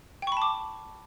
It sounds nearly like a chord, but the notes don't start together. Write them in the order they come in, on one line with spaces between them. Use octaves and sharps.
G5 C#6 B5 A5 D6